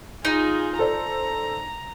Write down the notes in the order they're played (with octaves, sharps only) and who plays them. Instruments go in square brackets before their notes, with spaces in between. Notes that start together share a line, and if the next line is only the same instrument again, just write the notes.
[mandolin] D#4 [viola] F4 G#4
[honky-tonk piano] A4 C5 D5 [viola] A#5